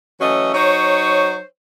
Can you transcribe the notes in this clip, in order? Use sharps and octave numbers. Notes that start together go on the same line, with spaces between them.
E3 F#3 A3 C#4 D#5
F#3 D#4 C5 C#5